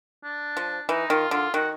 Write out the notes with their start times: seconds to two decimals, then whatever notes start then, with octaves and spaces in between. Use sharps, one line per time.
0.24 D4
0.57 F3
0.89 E3 D#4
1.10 D#3 F4
1.31 D3 F4
1.54 D#3 F#4